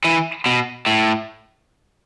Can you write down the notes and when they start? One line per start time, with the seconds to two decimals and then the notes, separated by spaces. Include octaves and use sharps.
0.05 E3
0.46 B2
0.87 A2